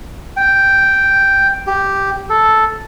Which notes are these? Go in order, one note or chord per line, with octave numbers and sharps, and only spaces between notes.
G5
G4
A4